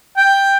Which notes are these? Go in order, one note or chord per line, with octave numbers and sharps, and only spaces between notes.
G5